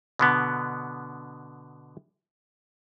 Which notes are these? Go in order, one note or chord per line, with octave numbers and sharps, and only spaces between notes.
B2 D3 B3